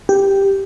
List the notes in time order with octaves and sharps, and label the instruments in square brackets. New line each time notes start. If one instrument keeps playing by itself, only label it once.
[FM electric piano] G4